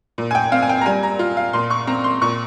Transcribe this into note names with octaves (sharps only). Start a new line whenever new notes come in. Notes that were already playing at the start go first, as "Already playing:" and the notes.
A#2
G#5
G5
C4 F5
G#5
G5
A#5
G3 G#5
A#5
F4
F5
A#2 C6
C#6
C4 A#5
C6
A#2 C#6